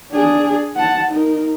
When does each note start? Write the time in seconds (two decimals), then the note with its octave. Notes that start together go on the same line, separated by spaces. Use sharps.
0.12 D4 G#4
0.76 F#5 A5
1.11 D#4 A#4